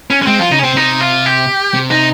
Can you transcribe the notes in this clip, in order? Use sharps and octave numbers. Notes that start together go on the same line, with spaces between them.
C#4
C#4
G#3 C4
F3 F4
C#3 D#4
C#4
C3 C4
C3 D#4
F4
G4
C3
D#4